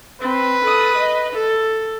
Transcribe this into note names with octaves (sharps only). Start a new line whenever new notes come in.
C4 B4
A4 D#6
D#5
A4